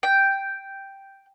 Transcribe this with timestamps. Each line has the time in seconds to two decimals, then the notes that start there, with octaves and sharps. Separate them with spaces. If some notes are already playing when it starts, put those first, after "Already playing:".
0.03 G5